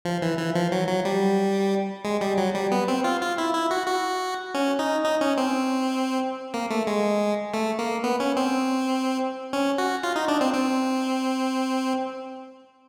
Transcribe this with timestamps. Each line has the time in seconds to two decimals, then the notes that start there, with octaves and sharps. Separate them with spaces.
0.05 F3
0.22 E3
0.38 E3
0.55 F3
0.72 F#3
0.88 F#3
1.05 G3
2.05 G#3
2.21 G3
2.38 F#3
2.55 G3
2.72 B3
2.88 C4
3.04 F4
3.21 F4
3.38 E4
3.54 E4
3.71 F#4
3.87 F#4
4.54 C#4
4.79 D#4
5.04 D#4
5.21 C#4
5.38 C4
6.54 A#3
6.70 A3
6.87 G#3
7.54 A3
7.79 A#3
8.04 B3
8.20 C#4
8.37 C4
9.53 C#4
9.78 F#4
10.03 F4
10.16 D#4
10.28 D4
10.41 C4
10.53 C4